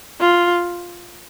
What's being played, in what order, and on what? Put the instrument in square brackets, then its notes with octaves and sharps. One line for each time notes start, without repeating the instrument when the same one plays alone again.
[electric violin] F4